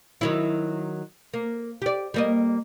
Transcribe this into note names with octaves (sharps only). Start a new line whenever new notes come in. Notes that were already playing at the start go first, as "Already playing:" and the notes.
D#3 F#3 E4
A#3
G4 D5
G3 A#3 D#5